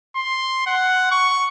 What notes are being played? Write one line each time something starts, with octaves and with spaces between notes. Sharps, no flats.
C6
F#5
C#6